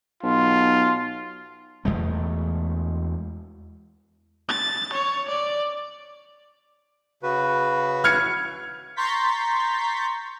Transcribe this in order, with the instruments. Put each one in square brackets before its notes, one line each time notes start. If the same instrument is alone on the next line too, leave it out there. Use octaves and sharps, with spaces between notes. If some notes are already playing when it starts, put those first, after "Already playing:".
[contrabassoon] B1 [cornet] F4
[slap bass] E2 G#3 A3
[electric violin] A6
C#5
D5
[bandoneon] C#3 F#4 B4
[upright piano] F6 G#6 C#7
[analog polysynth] A#5 C6 C#6 G6 A6 B6